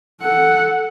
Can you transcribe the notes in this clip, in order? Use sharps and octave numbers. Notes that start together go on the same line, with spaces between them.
A4 F#5